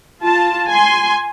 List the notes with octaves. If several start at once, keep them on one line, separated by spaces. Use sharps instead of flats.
F4 A5
G#5 C6